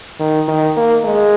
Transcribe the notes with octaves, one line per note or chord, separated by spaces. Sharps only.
D#3
D#3
A#3
G#3